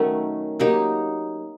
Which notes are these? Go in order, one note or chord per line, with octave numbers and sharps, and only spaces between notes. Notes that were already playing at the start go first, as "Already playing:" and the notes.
Already playing: D#3 F#3 A3 C#4
F#3 A#3 D#4 G4